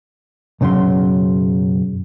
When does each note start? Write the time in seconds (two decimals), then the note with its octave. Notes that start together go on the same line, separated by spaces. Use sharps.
0.61 B1 F#2 C#3 F#3 C6